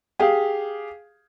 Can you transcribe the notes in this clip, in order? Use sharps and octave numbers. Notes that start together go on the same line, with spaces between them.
G4 G#4 F5